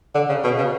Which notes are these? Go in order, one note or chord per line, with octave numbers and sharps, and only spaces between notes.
D3
C#3
B2
C#3